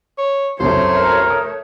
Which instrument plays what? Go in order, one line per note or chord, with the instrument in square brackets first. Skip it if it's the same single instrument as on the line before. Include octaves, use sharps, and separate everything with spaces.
[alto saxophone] C#5
[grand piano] C2 F#2 [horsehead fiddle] A3 C#5 [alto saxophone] C5
[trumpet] A#4
[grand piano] D#6